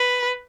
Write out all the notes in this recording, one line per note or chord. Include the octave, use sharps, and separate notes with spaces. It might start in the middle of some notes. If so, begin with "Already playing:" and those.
Already playing: B4